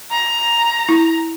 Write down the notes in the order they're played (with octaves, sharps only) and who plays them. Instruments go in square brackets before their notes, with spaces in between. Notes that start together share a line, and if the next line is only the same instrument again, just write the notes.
[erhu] A#5
[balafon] E4